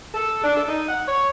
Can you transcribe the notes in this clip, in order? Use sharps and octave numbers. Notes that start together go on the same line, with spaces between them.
A4
D4
A4
D#4
F#5
C#5